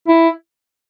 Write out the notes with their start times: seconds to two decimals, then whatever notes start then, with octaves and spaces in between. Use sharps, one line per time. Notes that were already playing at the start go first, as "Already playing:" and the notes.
0.08 E4